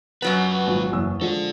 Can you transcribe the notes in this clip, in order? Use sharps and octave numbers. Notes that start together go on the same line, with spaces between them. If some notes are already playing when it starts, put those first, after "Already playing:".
F#2 F#3 B3 F4 B4
G#1 A#2
F#1 E2 E6
F3 G#3 D4 A4